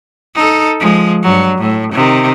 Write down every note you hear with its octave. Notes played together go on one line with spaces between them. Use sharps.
D#4 A4
F3 G#3
G2 F#3
A2
C3 D#3